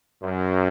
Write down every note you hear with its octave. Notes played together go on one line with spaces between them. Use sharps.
F#2